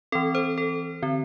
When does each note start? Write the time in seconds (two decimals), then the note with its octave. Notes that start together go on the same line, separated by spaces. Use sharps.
0.12 E3 C4 A4
0.35 C5
0.58 A4
1.03 D3 C4